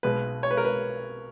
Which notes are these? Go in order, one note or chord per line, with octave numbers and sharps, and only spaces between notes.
B1 B2 G#3 B4
C#5
B4
A#4
B4